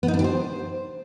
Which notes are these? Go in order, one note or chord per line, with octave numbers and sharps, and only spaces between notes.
B3
D#4
D4
G4
C5